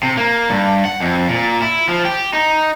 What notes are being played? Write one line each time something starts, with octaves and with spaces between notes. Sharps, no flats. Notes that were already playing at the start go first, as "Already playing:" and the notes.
C3
A#3
G2
F#5
F2
A#2
E4
F3
G4
D#4